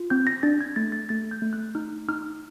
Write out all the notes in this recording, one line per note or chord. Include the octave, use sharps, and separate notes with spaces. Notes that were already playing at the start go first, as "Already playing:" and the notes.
Already playing: F4
C4 G6
A#6
D4 A6
G#6
A3 A6
A6
A3 A6
G6
A3
F#6
D#4 F6
D#4 F6